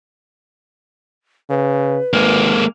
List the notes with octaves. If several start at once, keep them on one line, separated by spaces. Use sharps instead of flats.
C#3 B4
G#1 G#3 A#3